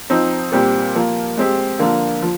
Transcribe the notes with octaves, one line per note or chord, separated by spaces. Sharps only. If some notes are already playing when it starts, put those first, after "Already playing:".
F3 C4 D#4
A#2 G3 C4 G4
F3 A#3 F4
G#3 C4 G4
D3 F3 A#3 F4
F3